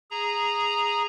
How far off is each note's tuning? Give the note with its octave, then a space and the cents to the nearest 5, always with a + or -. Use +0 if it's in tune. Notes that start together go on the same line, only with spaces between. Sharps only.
G#4 -10 A#5 +0